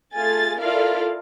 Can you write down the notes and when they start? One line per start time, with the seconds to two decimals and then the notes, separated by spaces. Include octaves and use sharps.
0.15 A3 F4 G#4 A4 G#5 A6
0.59 E4 F4 A4 A#4 D5 F5